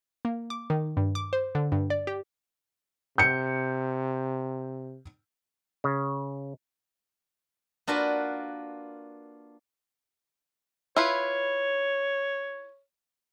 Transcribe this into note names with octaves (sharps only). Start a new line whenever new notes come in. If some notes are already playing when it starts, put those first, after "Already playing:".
A#3
D6
D#3
G2
D6
C5
D3
G2
D5
G4
C3 G6 C#7
C#3
A#3 D4 F4 F#4 B4 A5
E4 F4 B4 C#5